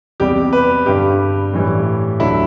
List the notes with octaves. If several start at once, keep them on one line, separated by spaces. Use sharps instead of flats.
E2 C3 G3 G4
B4
G2 D3 G3 G4
A2 E3 G3
D2 D3 F#3 E4